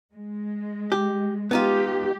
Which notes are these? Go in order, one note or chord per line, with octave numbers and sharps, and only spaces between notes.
G#3
G4
G#3 B3 D#4 F4 G4